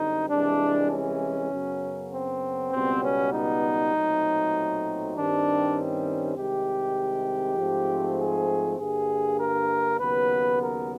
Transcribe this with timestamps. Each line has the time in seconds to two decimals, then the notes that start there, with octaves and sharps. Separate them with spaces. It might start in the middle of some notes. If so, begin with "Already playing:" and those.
Already playing: F#2 D3 G3 C4 D#4
0.30 C2 C3 E3 G#3 D4
0.90 C#4
1.51 F#2 C#3 F#3 B3
2.12 C4
2.72 C#2 B2 G3 B3 C4
3.03 C#4
3.33 D#4
3.94 B1 A#2 F#3 A3 C4
5.15 G2 D#3 G3 C4 D4
5.76 C#4
6.37 C2 C3 D#3 G#3 G4
7.57 G#2 F3 A3 C4
8.18 G#4
8.79 G2 D3 G3 A#3 G#4
9.39 A#4
10.00 D#2 C#3 F#3 B3 B4
10.61 A#4